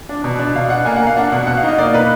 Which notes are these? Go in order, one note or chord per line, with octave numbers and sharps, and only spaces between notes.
D4
B2
D4
B2 F5
D4 F#5
A#3 G#5
F#5
A#3
F5
D4 F#5
B2 F#5
B2 F#5
F5
D#4
D#5
A#3 D5
D#4 B4